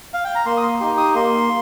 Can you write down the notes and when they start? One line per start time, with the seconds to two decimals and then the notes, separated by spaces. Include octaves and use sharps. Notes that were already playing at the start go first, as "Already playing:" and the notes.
0.14 F5
0.25 G5
0.35 A#5
0.46 A#3 C6
0.57 D#6
0.63 C6
0.80 D#4 G4 C6
0.98 D#6
1.15 A#3 C6